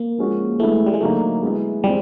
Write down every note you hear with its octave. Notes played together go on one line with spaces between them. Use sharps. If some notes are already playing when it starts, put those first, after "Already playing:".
Already playing: A#3
F3 G#3 C#4 F#4
E3 G#3 A3 B3 E4
G3
G#3
D3 F#3 A3 A#3 D#4
G#3 B3 E4
E3 G3 G#3 C4